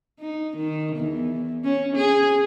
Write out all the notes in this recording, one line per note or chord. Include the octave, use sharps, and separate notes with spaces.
D#4
D#3
E2
C#4
G#4